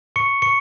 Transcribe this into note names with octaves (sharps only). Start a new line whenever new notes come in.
C#6 C#7
C#6 C#7